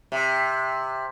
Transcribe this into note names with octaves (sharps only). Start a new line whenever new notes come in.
C3